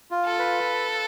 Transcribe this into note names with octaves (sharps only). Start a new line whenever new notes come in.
F4
A4
B4